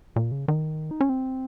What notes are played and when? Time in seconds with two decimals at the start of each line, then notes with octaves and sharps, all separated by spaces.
0.16 A#2
0.32 C#3
0.48 D#3
0.91 D#4
1.01 C#4
1.09 C4